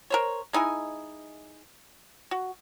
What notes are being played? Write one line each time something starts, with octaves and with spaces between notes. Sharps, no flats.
A#4 C5 C#5
G#3 D#4 E4 G#5
F#4